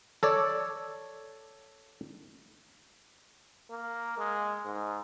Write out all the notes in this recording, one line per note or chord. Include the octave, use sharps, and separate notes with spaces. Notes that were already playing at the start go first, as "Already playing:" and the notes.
A4 C#5 D5
A#3
G#3
G#2